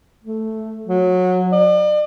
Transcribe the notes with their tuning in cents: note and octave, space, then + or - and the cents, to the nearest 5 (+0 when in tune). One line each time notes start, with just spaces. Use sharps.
A3 +0
F#3 -20
D5 +40